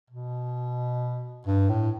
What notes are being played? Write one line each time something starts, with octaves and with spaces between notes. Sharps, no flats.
B2
G2
A2